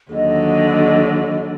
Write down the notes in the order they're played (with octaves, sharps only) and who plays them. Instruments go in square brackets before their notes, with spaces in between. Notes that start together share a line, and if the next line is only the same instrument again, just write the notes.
[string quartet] D#2 D3 F#3 [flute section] D#5